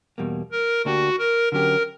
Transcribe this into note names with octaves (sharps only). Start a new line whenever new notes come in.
E2 B2 G3 A#3
A#4
D2 D3 A#3 D4 F#4 G4
A#4
D3 F#3 C#4 G4 A#4